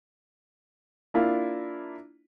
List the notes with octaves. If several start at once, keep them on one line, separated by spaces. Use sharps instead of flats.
A#3 D4 E4 F4